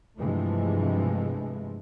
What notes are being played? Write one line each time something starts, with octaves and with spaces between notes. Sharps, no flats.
G2 C3 E3 F3 G#3 A3